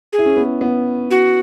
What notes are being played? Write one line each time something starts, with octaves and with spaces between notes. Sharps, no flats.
G#4
E4
C#4
B3
B3
F#4